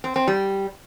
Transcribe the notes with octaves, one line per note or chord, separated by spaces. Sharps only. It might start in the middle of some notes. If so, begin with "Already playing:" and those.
C4
C4
G3